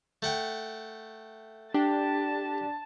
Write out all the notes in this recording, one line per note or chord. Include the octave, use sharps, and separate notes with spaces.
A3 F#5 G5
D4 G4 A5